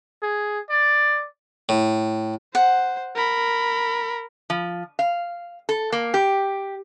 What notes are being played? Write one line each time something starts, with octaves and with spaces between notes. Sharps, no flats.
G#4
D5
A2
C5 F#5
A#4 B5
F3
F5
A4
A#3
G4